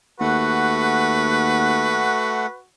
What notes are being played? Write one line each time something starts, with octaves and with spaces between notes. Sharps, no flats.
D#2 A3 F#4 B4 F#5